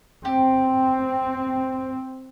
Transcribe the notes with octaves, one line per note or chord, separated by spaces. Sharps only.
C4 G4